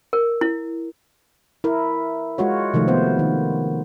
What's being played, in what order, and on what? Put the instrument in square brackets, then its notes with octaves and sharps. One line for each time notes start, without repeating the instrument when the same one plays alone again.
[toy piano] A#4
E4
[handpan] E4 A#4
G#3 F4 F#4 C#5
C3 D#3 F3 A3
B3 C5
D#3